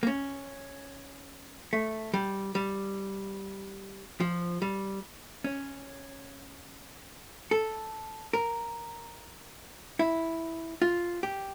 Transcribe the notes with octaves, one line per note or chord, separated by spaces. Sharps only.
A#3
C#4
A3
G3
G3
F3
G3
C#4
A4
A#4
E4
F4
G4